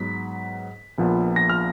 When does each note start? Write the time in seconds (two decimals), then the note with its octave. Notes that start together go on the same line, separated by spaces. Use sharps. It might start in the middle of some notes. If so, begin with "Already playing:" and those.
Already playing: G#2 F#3 B3 B6
0.98 A#1 A#2 F3 B3
1.36 A#6
1.49 F6